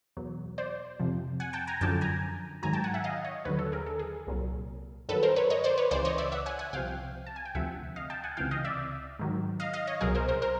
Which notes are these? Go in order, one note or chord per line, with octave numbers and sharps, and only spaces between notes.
E2 B2 F#3
C5 D5
F2 C3 F3
F#5 G#5
G5 A5
G#5 A#5
F#2 D3 F3 G5 A5
G#5 A#5
G#2 D#3 F#3 G#5 A#5
G5 A5
F#5 G#5
E5 F#5
D#5 F5
C#5 D#5
D#2 D3 F#3 B4 C#5
A4
G#4 A#4
A4
G#4
C2 A#2 F#3
G2 D#3 F#3 A4 B4
A#4 C5
B4 C#5
C#5 D#5
C5 D5
B4 C#5
C#2 C#3 E3 C5 D5
C#5 D#5
D5 E5
E5 F#5
F#5 G#5
F#5 G#5
C2 C3 F3 F5 G5
A5
G#5
G5
D2 C3 F3 E5 F#5
D#5 F5
G5 A5
F#5 G#5
C#2 C3 E3 F5 G5
D#5 F5
D5 E5
G#2 D#3 F#3
D#5 F5
D#5 F5
C#5 D#5
C2 B2 F#3 G#4 A#4
A#4 C5
A#4 C5
A#4 C5